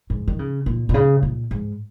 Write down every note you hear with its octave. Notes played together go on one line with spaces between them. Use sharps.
G#2
D#3
C#3
A#2
A#2
C#3
A#2
G#2